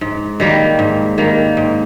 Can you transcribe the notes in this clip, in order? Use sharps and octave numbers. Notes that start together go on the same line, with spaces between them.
G#2
D#3 G3 A#3
G#2
D#3 G3 A#3
G#2